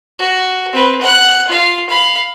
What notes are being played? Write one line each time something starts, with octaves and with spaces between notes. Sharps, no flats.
F#4
C4 B4
F#5 F#6
F4 F5
F5 B5